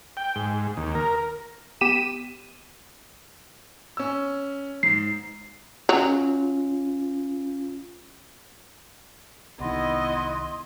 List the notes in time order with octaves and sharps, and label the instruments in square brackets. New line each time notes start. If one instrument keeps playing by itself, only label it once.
[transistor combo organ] G5
G#2
D#2
A#4
[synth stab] B3 G4 B6 D#7 E7
[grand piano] C#4 E6
[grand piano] G#2 [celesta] C7
[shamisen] F#3 [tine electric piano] C#4 F4
[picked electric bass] C2 D#3 [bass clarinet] B3 [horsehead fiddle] E4 D#5 [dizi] C6